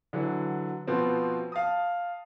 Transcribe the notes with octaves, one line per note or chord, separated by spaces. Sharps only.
D3 E3 F#3
B2 F3 B3 C4
F5 A5 D#6